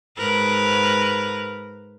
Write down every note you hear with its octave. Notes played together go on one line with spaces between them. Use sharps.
G#2 A#4 B4